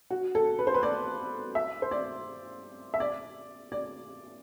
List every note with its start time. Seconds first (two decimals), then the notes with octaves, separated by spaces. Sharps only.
0.11 F#4
0.35 A4
0.59 B4
0.67 C5
0.74 B4
0.83 D5
1.55 E5
1.82 C5
1.91 D5
2.94 E5
3.00 D5
3.72 D5